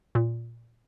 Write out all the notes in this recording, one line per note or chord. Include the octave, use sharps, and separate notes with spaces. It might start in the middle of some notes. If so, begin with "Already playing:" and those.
A#2